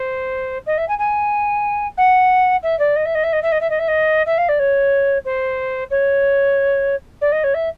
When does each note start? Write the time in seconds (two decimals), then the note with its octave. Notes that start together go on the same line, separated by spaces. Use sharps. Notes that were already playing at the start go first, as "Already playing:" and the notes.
Already playing: C5
0.66 D#5
0.77 E5
0.88 G#5
0.98 G#5
1.97 F#5
2.63 E5
2.79 D5
2.96 D#5
3.05 E5
3.15 D#5
3.23 E5
3.32 D#5
3.42 E5
3.52 D#5
3.60 E5
3.70 D#5
3.79 E5
3.88 D#5
4.26 E5
4.37 F5
4.48 D5
4.59 C#5
5.25 C5
5.90 C#5
7.21 D5
7.32 D#5
7.43 C#5
7.54 E5